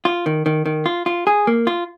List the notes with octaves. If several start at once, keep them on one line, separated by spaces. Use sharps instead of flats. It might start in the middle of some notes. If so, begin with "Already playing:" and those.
F4
D#3
D#3
D#3
F4
F4
G#4
A#3
F4